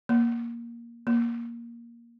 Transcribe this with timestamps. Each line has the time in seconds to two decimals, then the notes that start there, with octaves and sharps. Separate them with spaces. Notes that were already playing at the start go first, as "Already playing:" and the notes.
0.09 A#3
1.07 A#3